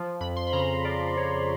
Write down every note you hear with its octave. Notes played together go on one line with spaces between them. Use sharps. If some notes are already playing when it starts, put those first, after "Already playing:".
Already playing: F3
F2 B5
C6
B5
C#3 A#5
F3 D5
F2 C#5